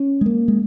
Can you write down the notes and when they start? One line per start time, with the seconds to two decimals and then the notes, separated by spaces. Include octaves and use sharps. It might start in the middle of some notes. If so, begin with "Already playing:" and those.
Already playing: C#4
0.21 G#3
0.26 A#3
0.48 G#3